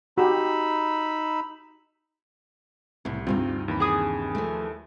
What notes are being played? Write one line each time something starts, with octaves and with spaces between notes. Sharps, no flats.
D#4 F#4 G4 B5 E6
C2 A2 C#3
D2 G2 C3 C4 D#4 F4
D#2 E3 B5
G#4 D#6
F3 A3